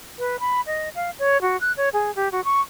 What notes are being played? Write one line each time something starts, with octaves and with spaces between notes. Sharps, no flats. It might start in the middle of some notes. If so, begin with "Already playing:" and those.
B4
B5
D#5
F5
C#5
F#4
F#6
C#5
G#4
G4
F#4
C#6